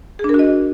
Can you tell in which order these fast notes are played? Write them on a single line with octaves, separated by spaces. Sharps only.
G#4 D4 A#4 F#4 D#5